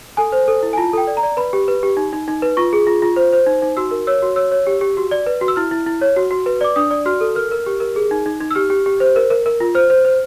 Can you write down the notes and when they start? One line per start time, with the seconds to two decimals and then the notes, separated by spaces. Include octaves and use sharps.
0.17 A4 G#5
0.32 C5
0.48 A4
0.63 E4
0.73 G#5
0.78 F4 A5
0.93 A4 G5
1.07 D5
1.17 A#5
1.23 D5
1.37 B4 B5
1.53 G4
1.68 B4
1.83 G4
1.97 D#4
2.13 D#4
2.28 D#4
2.42 B4
2.57 F4 C#6
2.73 G#4
2.87 F4
3.02 F4
3.16 C5
3.33 C5
3.46 D#4
3.62 D#4
3.77 F#4 E6
3.91 A#4
4.07 C#5 E6
4.22 F#4
4.36 C#5 E6
4.51 C#5
4.67 G4
4.81 G4
4.97 F#4
5.11 D5
5.26 B4
5.41 F#4
5.48 E6
5.56 E4 F6
5.71 E4
5.86 E4
6.01 C#5
6.16 F#4
6.31 F#4
6.46 B4
6.61 D5 D6
6.76 D4 D#6
6.91 D5
7.06 F#4 F6
7.21 A4
7.35 A#4 F6
7.51 A#4
7.66 G4
7.80 A#4
7.96 G#4
8.11 D#4
8.26 D#4
8.41 D#4
8.51 E6
8.55 G4 F6
8.70 G4
8.86 G4
9.00 C5
9.16 A#4
9.30 A#4
9.46 A#4
9.60 F4
9.75 C5 F6
9.90 C5
10.05 C5